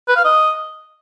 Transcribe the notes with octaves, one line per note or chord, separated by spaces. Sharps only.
B4
F5
D#5